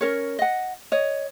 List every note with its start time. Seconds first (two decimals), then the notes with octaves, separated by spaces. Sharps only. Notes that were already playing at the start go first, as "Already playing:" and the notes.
0.01 C#4 A#4 C#5
0.39 D#5 F#5
0.92 C#5 D#5